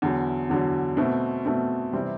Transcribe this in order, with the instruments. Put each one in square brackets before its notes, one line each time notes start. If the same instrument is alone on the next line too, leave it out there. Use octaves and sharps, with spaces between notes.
[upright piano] E2 D3 F#3
E2 D3 F#3
B2 A3 C4
B2 A3 C4
C3 E3 G3 C4